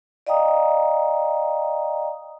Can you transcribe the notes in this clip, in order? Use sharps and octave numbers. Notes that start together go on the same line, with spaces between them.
D5 D#5 F5 G5 A#5 D#6